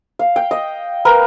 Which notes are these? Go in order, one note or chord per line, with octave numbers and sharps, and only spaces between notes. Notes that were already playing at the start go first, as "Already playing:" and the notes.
F5
G5
D#5
A#4 B4 G5